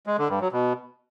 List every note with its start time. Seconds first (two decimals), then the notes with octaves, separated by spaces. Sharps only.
0.07 G#3
0.18 D3
0.29 G2
0.41 F#3
0.52 B2